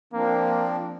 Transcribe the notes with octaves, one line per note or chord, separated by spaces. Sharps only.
F3 A#3 C4 D4